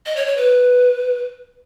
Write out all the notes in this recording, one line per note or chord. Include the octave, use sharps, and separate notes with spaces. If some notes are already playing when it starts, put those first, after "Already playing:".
D#5
C#5
C#5
B4